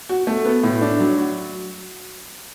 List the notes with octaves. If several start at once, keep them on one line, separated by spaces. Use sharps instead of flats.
F#4
A3
B3
A2
D4
F#3
F#4